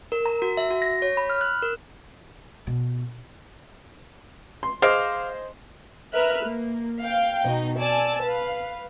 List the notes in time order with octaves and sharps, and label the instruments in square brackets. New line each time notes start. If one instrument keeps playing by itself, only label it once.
[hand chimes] A#4
A#5
F#4
E5
F#4
A#6
C#5
B5
F6
F#6
A#4
[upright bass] B2
[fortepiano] C6
[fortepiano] G#4 C5 D#5 [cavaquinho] F5 D6
[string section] A#4 B4 E5 F6 F#6
A#3
F5 G5
B2 D#4
D5 G#5 A5 E6
B4 F5